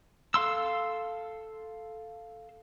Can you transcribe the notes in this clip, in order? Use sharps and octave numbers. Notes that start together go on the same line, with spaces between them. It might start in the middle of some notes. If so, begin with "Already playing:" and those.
A4 F5 C6 E6